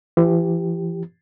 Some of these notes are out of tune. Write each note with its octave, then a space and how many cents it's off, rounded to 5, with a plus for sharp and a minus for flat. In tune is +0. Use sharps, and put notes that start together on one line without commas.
E3 +40 G4 +0